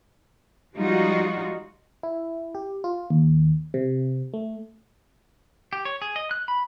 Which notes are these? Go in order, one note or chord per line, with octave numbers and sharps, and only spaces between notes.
F3 G3 G#3 D#4 F4 F#4
E4
G4
F4
D#2
C3
A3
G4
C#5
G#4
D#5
F#6
B5